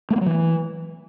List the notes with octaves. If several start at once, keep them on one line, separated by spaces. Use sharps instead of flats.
A3
A#3
F#3
E3